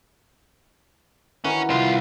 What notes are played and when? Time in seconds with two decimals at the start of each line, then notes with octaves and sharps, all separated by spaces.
1.44 D#3 E3 C#4 F#4
1.70 C2 F4